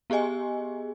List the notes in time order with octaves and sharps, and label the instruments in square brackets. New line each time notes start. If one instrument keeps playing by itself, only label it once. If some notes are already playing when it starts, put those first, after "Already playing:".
[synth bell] B3 G4 G#4 D#5 G#5